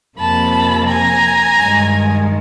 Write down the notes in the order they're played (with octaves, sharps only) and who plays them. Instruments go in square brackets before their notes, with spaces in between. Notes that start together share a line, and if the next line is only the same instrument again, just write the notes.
[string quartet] F2 C3 F3 A#3 A5 B5
G#5 A#5
G2 D#3 G#3